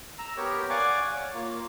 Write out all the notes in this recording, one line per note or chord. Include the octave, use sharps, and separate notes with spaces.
A#5 E6
B3 G4 A#4 C#5
D5 F5 F#5 G#5 C#6 D6
C#5
A#3 F4